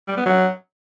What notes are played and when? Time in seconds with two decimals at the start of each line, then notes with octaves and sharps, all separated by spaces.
0.08 G3
0.17 B3
0.26 F#3